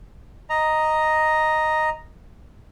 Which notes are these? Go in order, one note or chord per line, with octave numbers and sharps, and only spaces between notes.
D#5 A#5